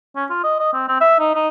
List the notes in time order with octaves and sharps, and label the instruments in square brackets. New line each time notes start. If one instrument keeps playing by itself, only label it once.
[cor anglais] C#4
F4
D#5
D#5
C4
C4
E5
D#4
D#4